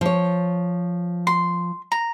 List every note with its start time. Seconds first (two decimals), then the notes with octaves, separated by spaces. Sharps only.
0.01 F3 C#5
1.27 C6
1.92 A#5